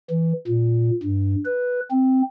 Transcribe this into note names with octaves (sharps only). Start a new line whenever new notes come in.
E3
A#2
G2
B4
C4